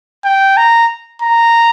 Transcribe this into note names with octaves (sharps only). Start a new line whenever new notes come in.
G5
A#5
A#5